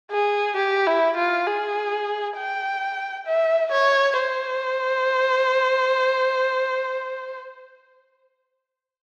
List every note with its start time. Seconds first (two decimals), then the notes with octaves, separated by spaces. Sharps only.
0.12 G#4
0.57 G4
0.87 E4
1.17 F4
1.47 G#4
2.37 G5
3.27 E5
3.72 C#5
4.16 C5